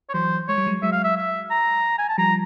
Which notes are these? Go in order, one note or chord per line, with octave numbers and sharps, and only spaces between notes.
C#5
E3 F#3 C5
G#3 C#5
G3
F#3 G#3
F#3 G#3 E5
F5
E5
E5
A#5
G#5
A5
F3 G3 A#5